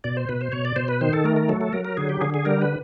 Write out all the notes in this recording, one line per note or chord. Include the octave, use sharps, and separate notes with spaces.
B2 D5
C5
B2 B4
C5
B2 C#5
D5
B2 C5
B4
D#3 C5
A4
A3 A#4
A#4
F#3 A4
A4
F#3 A#4
A#4
D3 G#4
G4
D3 G#4
G#4
G3 A#4
B4